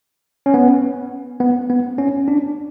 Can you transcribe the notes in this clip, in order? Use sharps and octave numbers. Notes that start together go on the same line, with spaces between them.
C#4
B3
B3
B3
C#4
D4